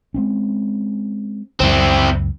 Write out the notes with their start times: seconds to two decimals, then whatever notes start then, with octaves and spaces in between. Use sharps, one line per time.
0.14 G#3 C4 C#4
1.60 C#2 F#2 C4 E4